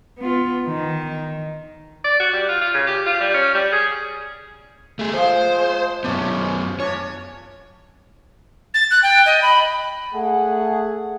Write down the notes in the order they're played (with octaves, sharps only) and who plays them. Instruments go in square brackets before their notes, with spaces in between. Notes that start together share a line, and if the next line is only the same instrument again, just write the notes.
[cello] B3 F4
D#3
[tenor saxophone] D5
F#4
G3
F4
F4
C#3
G4
F4
G3
C#4
G3
G#4
[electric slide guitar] A3 G#4
[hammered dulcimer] F3 G#3 [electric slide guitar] C5
[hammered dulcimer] G#3
[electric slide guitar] F#2 B3 [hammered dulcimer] C#4 D4
[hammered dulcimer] C#4 D4 [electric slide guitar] C#5
[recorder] A6
F#6
G5
D#5
B5
[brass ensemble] A3 G#4 F#5